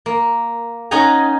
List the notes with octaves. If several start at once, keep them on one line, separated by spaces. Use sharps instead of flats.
A#3
C#4 D#4 D#5 F#5 G#5 A#5